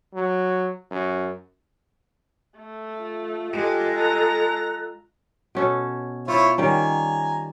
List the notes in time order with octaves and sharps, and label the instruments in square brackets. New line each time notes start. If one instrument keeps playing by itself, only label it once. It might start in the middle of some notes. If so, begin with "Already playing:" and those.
[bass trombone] F#3
F#2
[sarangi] A3
[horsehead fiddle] F4
[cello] G#3 [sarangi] G4 [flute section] A4 D#5 F#6
[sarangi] A#5
[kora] B2 C#4 A4
[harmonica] E4 C5 C#5 [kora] F4
[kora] D#3 G3 C#4 [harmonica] G#5 A#5